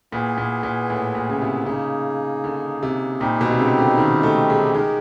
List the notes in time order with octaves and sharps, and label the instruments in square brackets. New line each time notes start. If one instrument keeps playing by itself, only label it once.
[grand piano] A#2 [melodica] B3 E4 G#4 B4
[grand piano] A#2
A#2
A2
A#2
C#3
C3
[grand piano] C#3 [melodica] A#3 D#4 G#4
[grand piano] D3
C3
[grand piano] A#2 [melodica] G3 C4 D#4 G4
[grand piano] B2
C3
C#3
D3
D#3
A3
G#3
[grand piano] G#3 [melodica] D#4 G4 A#4